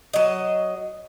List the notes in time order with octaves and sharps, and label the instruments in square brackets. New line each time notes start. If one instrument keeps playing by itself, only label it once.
[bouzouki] F#3 D#5